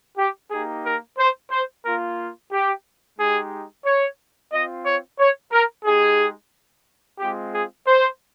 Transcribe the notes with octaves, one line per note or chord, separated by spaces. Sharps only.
G4
A#3 D#4 G4 G#4
A#4
C5
C5
A#3 F4 A#4
G4
G#3 D#4 G4 G#4
C#5
C4 F4 D#5
C#5
C#5
A#4
G#3 D#4 G4 G#4
G#3 C4 F4 G4
G#4
C5